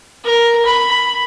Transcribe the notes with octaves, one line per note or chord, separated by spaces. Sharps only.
A#4
B5